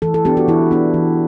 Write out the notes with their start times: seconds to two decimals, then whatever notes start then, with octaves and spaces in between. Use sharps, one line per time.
0.02 E3 A4
0.14 A4
0.25 B3 D4 G4
0.37 F#4
0.48 E3 E4
0.71 B3 D4
0.94 E3